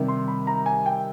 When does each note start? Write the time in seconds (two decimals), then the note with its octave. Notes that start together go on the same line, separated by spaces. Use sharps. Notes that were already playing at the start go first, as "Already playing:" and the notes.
Already playing: C3 D#3 G3
0.08 C6
0.28 B5
0.47 A#5
0.66 G#5
0.86 G5